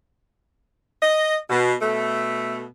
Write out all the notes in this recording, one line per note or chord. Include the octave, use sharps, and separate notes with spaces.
D#5
B2
B2 A3